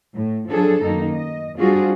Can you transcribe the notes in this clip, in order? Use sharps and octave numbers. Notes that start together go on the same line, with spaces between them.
A2
F3 F#3 D4 G#4 A4
F#2 D#3 A#3 D#4
D#5
G3 C4 D4 F4 F#4 G#4